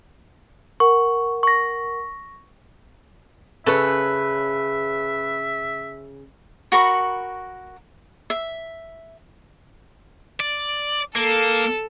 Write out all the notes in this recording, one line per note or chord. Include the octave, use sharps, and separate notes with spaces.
A#4 F#5 C#6
C#6 A#6
C#3 A4 B4 C#5 E5
F#4 A#4 B5 C#6
E5
D5
A#3 A4